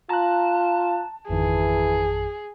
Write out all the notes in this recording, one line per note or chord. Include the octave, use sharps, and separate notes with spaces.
F4 A5 A#5 F#6
G#1 F2 D#3 E3 G#4